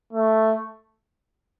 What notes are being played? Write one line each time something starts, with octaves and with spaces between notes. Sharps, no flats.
A3